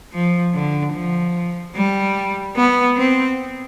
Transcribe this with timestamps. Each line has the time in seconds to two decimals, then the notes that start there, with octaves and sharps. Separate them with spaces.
0.13 F3
0.54 D3
0.93 F3
1.75 G3
2.56 B3
2.96 C4